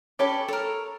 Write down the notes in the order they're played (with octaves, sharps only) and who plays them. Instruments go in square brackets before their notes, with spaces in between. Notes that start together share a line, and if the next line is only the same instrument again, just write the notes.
[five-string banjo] C#4 G4 C#5 [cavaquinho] A4 B4 D6
[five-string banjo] A4 [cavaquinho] A#4 C#5